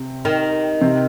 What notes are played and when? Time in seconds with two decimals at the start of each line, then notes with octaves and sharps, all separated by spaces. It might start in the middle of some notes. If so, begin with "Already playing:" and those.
Already playing: C3 C4
0.25 D#3
0.81 C3 C4